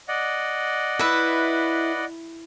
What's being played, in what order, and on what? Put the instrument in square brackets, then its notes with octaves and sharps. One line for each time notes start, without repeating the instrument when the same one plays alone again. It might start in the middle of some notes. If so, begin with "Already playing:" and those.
[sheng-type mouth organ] D5 D#5 F#5
[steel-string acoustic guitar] E4 [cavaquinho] B4 E5